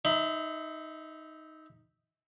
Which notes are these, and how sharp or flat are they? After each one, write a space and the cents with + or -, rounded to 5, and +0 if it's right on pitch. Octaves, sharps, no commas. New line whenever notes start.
D#4 +5 E5 -15 B5 +40